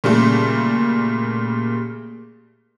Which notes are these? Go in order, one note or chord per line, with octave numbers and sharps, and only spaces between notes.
A#2 C#3 G3 A3